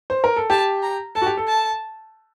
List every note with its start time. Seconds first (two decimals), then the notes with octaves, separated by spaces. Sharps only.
0.10 C5
0.24 A#4
0.36 A4
0.50 G4 A5
0.83 A#5
1.15 A4 A5
1.22 F#4
1.26 G4
1.37 A4
1.48 A5